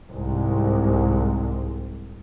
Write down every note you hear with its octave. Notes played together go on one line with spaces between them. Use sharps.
C2 G#2 G#3